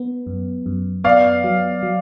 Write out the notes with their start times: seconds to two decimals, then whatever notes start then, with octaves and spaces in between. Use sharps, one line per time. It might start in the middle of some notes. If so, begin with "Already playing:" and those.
Already playing: B3
0.27 F#2
0.66 F#2
1.04 B3 D5 F5
1.44 F#3
1.83 F#3